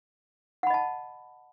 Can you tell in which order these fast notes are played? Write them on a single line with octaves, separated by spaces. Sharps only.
F#5 B5 D#5 A5